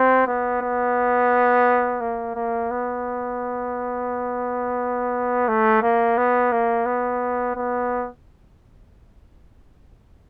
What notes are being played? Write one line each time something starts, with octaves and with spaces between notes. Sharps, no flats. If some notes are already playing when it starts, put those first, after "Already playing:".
Already playing: C4
B3
B3
A#3
A#3
B3
A3
A#3
B3
A#3
B3
B3